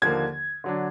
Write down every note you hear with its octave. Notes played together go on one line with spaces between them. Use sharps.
D#2 D3 F3 A#3 G#6
D3 F#3 D4